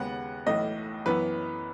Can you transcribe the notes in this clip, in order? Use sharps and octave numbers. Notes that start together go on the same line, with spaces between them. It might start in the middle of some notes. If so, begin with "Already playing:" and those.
Already playing: D#2 C#3 G#3 B3 F#5
B1 A2 E3 D#5
F#2 E3 B3 B4